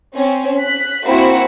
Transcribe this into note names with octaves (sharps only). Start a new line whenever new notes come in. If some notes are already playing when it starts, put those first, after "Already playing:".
C4 C#4
F#6 B6
A#3 C4 E4 F#4 B5 C#7